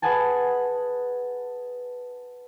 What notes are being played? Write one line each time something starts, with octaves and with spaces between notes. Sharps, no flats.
G#4 B4 D#5 F#5 G#5 A5